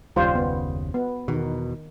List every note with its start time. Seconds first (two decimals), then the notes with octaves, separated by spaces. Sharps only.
0.16 F#1 D#2 C#3 G3 F4 C5
0.35 B3
0.94 B3
1.28 E2 B2 D#3